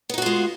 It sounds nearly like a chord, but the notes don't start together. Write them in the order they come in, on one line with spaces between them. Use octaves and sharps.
B3 D#4 F#4 F4 G#3